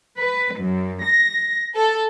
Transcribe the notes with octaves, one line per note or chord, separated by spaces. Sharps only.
B4
F#2
A#6
A4